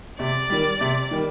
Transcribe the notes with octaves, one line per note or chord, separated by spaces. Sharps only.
C3 D5
D#3 G3
C3
D#3 G3